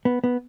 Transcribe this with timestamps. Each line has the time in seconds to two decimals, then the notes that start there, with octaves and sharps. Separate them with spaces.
0.05 B3
0.24 B3